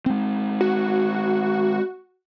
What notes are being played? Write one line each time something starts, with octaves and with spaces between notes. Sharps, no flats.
G#3 C4
F#4